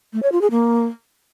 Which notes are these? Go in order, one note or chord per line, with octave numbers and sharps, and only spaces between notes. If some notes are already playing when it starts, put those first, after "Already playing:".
A3
C#5
F4
G#4
A#3